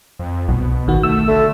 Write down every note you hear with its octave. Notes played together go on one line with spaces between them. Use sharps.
F2
C2 B2
G#1 D#3 F#4
A3 E6
D3 A3